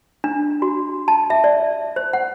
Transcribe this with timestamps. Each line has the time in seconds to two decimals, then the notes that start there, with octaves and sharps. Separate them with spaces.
0.24 D4
0.62 F#4
1.08 A5
1.30 E5
1.44 D5
1.96 C5
2.13 F#5